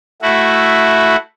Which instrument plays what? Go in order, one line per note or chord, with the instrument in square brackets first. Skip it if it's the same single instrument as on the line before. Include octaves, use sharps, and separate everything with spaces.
[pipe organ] A3 E4 F#4